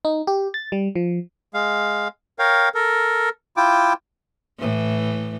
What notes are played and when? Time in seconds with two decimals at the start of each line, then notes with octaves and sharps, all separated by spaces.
0.05 D#4
0.27 G4
0.54 A6
0.72 G3
0.95 F3
1.54 G#3 F5
2.39 A#4 C#5 F5 G5
2.74 A4 A#4
3.57 E4 F4 G5 D6
4.59 A2 E3